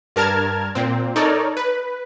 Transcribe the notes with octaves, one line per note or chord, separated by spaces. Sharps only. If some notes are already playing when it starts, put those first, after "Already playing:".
G2 A#4 A5 F6 G#6
A#2 C4
D#4 A4 A#4 C#5 D5
B4